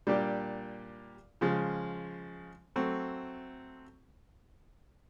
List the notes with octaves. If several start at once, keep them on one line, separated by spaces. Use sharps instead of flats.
A#2 G3 A#3 D4 G4
C#3 F3 G#3
F#3 A3 C4